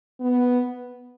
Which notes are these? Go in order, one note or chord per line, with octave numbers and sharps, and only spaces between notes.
B3